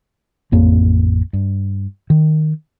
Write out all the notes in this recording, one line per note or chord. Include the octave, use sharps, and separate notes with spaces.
A1 F2 A#3
G2
D#3